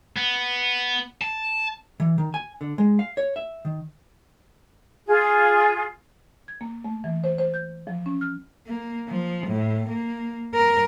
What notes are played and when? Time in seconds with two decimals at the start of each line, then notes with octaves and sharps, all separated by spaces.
0.16 B3
1.21 A5
2.00 E3
2.18 D#3
2.34 G#5
2.61 D3
2.78 G#3
2.99 F5
3.17 C#5
3.36 E5
3.65 D#3
5.07 F4 G#4
6.48 G#6
6.61 A#3
6.84 A3
7.04 E3
7.24 C5
7.38 C5
7.54 G6
7.87 F3
8.06 C#4
8.21 F6
8.67 A#3
9.08 F3
9.47 A2
9.89 A#3
10.54 A#4